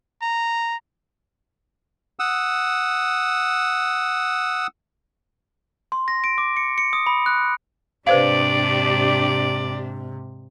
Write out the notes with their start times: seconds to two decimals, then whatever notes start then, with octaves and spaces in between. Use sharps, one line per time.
0.22 A#5
2.19 F#5 D#6 E6
5.92 C6
6.08 A#6
6.24 D7
6.38 D6
6.57 C#7
6.78 C#7
6.93 D#6
7.06 B5
7.26 F#6
8.07 G#2 C3 D4 G4 B4 C5 D5 F5